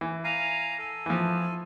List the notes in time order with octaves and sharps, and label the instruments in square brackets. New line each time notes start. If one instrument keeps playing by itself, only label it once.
[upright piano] E3
[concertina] F5 G#5 A#5
A4 G#5
[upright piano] E3 F3